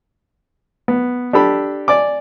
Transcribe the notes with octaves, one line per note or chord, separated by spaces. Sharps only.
B3
D4 G4 A4 B5
D5 G#5 D6